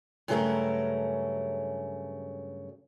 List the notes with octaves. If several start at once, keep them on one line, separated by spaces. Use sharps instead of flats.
G2 C#3 F#3 A3 C#4 A#4